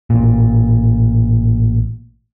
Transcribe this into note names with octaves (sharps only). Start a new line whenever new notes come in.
A1 A#2